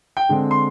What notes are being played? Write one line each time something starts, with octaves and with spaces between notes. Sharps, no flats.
G5
D3 G#3 C4
C6